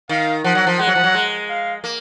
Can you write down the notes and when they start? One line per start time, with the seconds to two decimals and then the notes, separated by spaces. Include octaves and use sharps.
0.09 D#3 F5
0.44 F3 F#5
0.55 F#3
0.67 F3
0.80 G#3 F#5
0.87 F#3
0.95 F3
1.04 F#3
1.14 G#3
1.49 F5
1.84 A#3